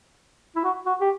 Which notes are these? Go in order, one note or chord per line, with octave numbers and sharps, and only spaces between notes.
E4
F#4
F#4
G4